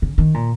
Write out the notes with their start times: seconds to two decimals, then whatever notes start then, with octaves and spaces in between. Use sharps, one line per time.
0.02 C#3
0.18 D#3
0.34 A#2